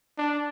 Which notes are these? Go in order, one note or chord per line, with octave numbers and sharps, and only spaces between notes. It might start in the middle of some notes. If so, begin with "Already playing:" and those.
D4